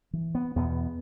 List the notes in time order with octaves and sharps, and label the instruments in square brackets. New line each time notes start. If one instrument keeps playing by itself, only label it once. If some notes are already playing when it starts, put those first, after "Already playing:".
[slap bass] E3
B3
E2 B2 B3